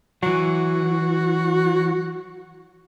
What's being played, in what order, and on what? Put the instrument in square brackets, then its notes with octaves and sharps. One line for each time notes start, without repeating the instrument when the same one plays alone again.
[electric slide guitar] E3 F#3 [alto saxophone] F#4